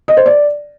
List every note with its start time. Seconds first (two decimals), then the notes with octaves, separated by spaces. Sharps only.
0.08 D#5
0.17 C5
0.26 D5